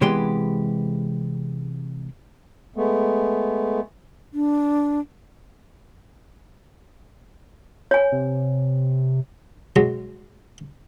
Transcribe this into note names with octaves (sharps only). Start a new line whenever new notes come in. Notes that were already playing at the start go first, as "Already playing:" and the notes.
C3 E3 G#3 B3 G4 C6
G#3 A3 B3
D4
C#5 G#5
C3
B2 F#3 G#3